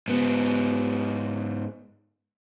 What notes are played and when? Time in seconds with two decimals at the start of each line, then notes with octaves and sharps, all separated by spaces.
0.08 G#2 B3